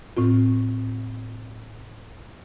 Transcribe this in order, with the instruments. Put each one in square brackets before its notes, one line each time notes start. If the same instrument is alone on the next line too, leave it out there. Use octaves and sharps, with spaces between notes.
[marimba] A2 C4 F4